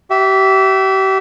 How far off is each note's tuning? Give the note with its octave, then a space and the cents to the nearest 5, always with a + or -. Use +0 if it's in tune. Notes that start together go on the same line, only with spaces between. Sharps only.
G4 -35 E5 +0